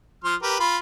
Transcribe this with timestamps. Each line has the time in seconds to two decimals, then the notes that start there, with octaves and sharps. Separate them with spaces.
0.24 F3 C6 F6
0.42 G4 A#4 B4
0.59 F4 B5